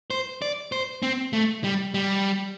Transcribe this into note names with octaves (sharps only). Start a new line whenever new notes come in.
C5
D5
C5
C4
A3
G3
G3